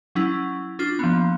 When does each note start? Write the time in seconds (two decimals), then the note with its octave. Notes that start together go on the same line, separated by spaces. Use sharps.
0.15 F#3 C#4 E4
0.79 D4 F4 D6
0.99 F3 A#3 B3